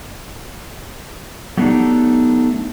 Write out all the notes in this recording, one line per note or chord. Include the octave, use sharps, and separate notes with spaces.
F#3 A3 B3 D4 D#4 G4